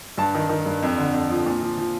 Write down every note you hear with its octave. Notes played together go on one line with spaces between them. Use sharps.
G2 A5
D#3
D#3
G2
F2
D3
F2
F3
A#2
F3
F3